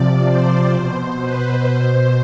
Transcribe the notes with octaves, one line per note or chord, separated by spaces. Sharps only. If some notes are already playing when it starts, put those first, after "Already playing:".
Already playing: C3 F3 D5
C5
B2 C5
B4
B2 C5